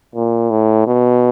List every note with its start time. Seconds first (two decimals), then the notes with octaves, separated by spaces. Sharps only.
0.15 A#2
0.50 A2
0.87 B2